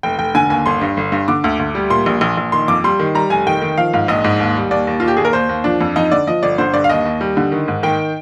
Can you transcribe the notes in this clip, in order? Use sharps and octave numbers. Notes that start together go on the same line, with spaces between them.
F1 G5
F1 G5
D3 G#5
D#2 G#5
G1 C6
G2
G1
G2
D3 D6
D2
D2
G3
A#2 C6
A#1
A#1
A#1
D#3 C6
F2 D6
G3 C6
D#3
G3 A#5
F1 G#5
D#3 G5
D#3
F3 F5
G#2 F5
A#1 D#5
G#2
D#2
G3
D#2 D5
D#2
D#2 F4
G4
D#2 G#4
A#4
D#2 C5
D#2
F3 D4
F2
F2 D#4
D3 D5
F3 D#5
G1 D5
D3 C5
G2 D5
F5
D#2 D#5
D#2
G3
D3
D#3
G#2
D#3 G5